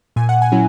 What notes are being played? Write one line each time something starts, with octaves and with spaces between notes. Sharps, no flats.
A#2 G#5
F#5
G#5
F#3 C#4 E4